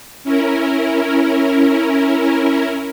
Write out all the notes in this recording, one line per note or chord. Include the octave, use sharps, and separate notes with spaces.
C#4 E4 A#4